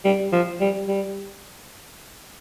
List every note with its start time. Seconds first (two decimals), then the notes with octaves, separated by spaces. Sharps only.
0.05 G3
0.33 F3
0.61 G3
0.89 G3